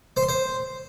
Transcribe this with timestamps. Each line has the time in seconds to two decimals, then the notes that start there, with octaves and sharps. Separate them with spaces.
0.17 C5
0.23 C6
0.29 C5